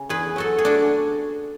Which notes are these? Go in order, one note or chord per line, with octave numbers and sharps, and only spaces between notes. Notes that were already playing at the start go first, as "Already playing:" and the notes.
Already playing: C#3
E2 G#4 B4
F#3 F#4 A4
G#4
A3 D4 F#4